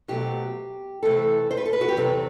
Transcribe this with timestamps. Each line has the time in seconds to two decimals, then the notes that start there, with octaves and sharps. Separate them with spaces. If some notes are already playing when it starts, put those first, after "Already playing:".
0.08 B2 F#3 A3 C4 G4
1.03 C3 E3 A3 C4 A4
1.51 C5
1.57 B4
1.66 A4
1.73 B4
1.81 F#4
1.88 G4
1.97 E2 C3 F#3 C4 A4